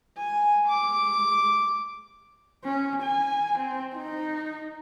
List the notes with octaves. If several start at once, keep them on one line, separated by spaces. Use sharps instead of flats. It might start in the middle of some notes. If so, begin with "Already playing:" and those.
G#5
D6
C#4
G#5
C4
D#4